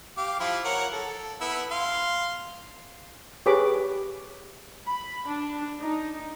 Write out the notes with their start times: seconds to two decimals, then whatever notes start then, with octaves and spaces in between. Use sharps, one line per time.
0.17 G4 F5 D6
0.40 F3 E4 F4
0.64 A#4 C#5 F#5
0.93 A4
1.41 B3 E4 E6
1.71 F5 C6
3.46 G4 G#4 B4 C#5 B5 D6
4.87 B5
5.28 D4
5.80 D#4